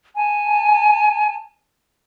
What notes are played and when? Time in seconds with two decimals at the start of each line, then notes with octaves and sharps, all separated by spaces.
0.16 G#5 A5